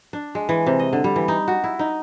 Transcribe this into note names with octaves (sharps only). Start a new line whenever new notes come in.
D4
G#3
E3
C3
D#5
D3
G3
E3
D#4
F#4
E4
D#4